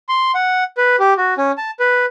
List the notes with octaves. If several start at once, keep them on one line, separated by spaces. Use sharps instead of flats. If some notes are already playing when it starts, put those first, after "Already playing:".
C6
F#5
B4
G4
F#4
C#4
A5
B4